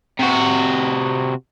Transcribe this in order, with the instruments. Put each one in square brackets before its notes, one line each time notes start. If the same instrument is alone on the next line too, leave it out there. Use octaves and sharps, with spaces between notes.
[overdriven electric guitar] C3 F#4